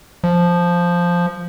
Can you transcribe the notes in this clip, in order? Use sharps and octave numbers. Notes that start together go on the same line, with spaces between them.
F3